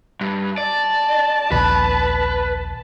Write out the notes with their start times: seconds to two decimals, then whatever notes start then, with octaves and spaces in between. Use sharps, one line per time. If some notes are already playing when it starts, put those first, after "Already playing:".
0.21 G2
0.58 D5 A5
1.52 A#1 D#2 B4